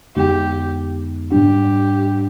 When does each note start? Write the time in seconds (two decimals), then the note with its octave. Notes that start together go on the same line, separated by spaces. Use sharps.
0.16 F2 D3 G#3 B3 D#4 G4
1.32 G#2 G3 D4 G4